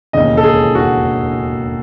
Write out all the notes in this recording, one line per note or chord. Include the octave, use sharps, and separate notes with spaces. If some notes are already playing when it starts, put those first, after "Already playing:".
E1 D#2 C#3 D#5
A4
G#4
F#4